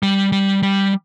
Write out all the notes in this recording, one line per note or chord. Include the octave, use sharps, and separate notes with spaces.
G3
G3
G3